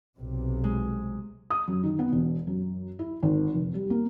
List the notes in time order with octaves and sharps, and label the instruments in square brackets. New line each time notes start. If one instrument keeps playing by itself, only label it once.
[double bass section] B1 C3
[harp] G#3
[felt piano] D#6
F#2
D#3
B3
E1
F#2
E4
G#1
F1
G3
A#3